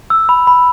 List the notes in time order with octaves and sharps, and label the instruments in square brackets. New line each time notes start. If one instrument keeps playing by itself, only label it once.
[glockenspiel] E6
B5
B5